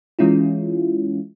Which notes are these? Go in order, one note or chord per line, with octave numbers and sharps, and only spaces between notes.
E3 G#3 C#4 E4 F4